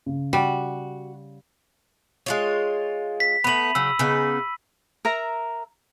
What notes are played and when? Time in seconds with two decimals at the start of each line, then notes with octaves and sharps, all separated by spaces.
0.06 C#3
0.33 G3 F#4
2.26 G#3 F4 C#5
3.20 B6
3.44 A3 B3 B5 D#7 F#7
3.75 C#3 F#3 E6
3.99 C#3 B3 D#4
5.05 A#4 E5 A#5